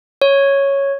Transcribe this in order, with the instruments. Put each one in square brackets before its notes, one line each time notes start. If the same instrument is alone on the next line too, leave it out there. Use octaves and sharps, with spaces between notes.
[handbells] C#5